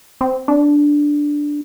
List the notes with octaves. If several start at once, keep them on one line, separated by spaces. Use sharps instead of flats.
C4
D4